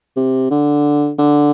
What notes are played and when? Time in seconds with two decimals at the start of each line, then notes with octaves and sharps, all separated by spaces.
0.16 C3
0.51 D3
1.19 D3